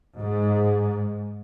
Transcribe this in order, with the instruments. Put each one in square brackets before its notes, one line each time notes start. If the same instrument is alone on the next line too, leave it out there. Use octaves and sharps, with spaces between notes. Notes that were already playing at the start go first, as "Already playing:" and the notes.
[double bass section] G#2